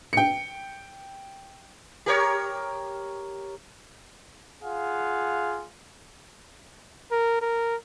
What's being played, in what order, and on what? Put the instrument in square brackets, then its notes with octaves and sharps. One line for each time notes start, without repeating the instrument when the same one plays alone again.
[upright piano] G5 C#7
[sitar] G4 A#4 C#5
[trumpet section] F4 G#4 F5 F#5
[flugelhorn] A#4
A#4